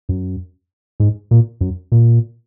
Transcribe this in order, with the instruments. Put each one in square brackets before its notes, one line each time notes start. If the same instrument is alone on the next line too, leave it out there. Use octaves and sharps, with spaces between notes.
[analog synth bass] F#2
G#2
A#2
F#2
A#2